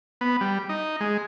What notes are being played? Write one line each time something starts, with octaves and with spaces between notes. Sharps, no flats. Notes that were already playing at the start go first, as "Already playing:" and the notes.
B3
G3
D#4
G#3